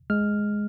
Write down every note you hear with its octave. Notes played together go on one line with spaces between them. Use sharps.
G#3 F6